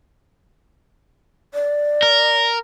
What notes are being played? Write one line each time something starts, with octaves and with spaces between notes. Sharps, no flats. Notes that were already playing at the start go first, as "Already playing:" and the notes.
D5
A#4